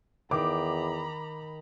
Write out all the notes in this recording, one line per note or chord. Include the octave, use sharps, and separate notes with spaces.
E2 D#3 A#5 B5 D6